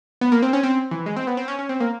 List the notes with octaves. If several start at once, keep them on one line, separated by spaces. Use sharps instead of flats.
B3
A#3
C4
C#4
C4
E3
G#3
C4
B3
C4
C#4
C#4
C4
A#3